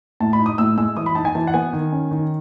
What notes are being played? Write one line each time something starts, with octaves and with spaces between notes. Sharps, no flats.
A2 A5
B5
D#4
D#6
A2 E6
G#3 E6
E3 D#6
B5
D#4 A5
G#5
E3 A5
F#5
B3 G#5
D#3
C#4
D#3